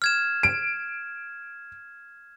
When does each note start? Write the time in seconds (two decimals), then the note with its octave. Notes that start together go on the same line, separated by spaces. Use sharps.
0.02 F6 G#6 E7
0.43 D7